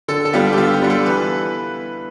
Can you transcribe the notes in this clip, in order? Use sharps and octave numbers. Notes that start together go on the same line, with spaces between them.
D3 A4
A4
G3 B3 F4 G4
G4
D3 F4
G4
G3 B3 F4
A4
E3 B4